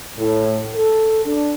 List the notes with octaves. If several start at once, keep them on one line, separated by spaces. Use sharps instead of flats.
A2
A4
D4